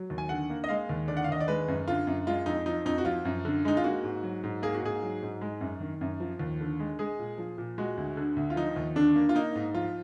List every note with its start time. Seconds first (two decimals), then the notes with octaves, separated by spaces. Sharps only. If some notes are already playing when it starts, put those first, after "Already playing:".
Already playing: F#3
0.10 D#2
0.18 G#5
0.29 D3 F#5
0.50 A#3
0.64 D#5
0.69 G#3 F5
0.89 D#2
1.08 D3 D5
1.17 F#5
1.24 F5
1.29 D#2 D#5
1.40 D5
1.48 G#3 B4
1.68 F#2
1.88 D3 F4
2.07 F#2
2.27 G#3 F4
2.46 F2 D#4
2.66 F3 D#4
2.85 F2 D#4
2.98 F#4
3.05 F3 F4
3.25 F#2
3.45 D3
3.65 G#3 D#4
3.77 F4
3.84 A#3 F#4
4.04 G#2
4.23 F#3
4.43 G#2
4.62 A#3 G#4
4.74 F#4
4.82 G#2 G#4
5.02 F#3
5.23 G#2
5.41 G#3
5.61 F#2
5.80 D#3
6.01 F#2
6.20 F3
6.40 D#2
6.60 D3
6.80 G#3
6.99 G#3 G#4
7.19 A#2
7.38 F3
7.58 A#2
7.78 G#3 F#4
7.97 D2
8.17 D3
8.36 D2
8.50 F4
8.56 F3 D#4
8.76 D#2
8.96 D3 D4
9.16 A#3
9.29 F4
9.35 A#3 D#4
9.55 G#2
9.74 F3 F4